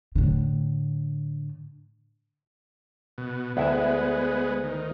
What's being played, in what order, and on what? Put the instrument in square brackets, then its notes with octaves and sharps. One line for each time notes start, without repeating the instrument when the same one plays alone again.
[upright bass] A2 D3
[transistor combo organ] B2
[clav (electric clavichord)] D2 E4 E5 [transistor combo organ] G#3 B3
[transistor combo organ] D#3